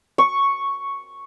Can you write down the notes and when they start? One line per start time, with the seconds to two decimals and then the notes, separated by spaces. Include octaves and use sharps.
0.18 C#6